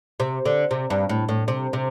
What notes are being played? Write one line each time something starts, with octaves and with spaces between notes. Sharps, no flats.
C3
D3
C3
G2
A2
A2
C3
C3